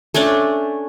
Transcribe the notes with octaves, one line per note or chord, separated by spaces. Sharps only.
A3 C#4 D4 D5